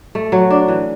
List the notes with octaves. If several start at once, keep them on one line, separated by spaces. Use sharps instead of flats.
A3
F#3
D4
E3